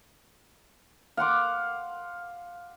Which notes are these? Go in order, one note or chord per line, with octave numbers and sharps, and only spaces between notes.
F5 F#5 C6 D6